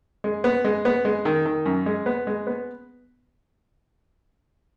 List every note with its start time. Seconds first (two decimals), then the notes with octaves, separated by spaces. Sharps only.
0.24 G#3
0.44 B3
0.65 G#3
0.85 B3
1.05 G#3
1.25 D#3
1.45 D#3
1.66 F#2
1.86 G#3
2.06 B3
2.27 G#3
2.47 B3